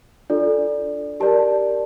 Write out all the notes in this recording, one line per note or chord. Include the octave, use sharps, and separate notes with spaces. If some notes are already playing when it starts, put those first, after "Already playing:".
D4 F4 A4 D5
G4 A#4 D5 A5